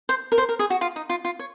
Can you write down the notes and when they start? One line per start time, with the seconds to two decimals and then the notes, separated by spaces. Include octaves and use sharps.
0.09 C5
0.32 A#4
0.38 C5
0.49 A#4
0.59 G#4
0.70 F#4
0.81 F4
0.96 D#4
1.10 F4
1.25 F4
1.39 C#5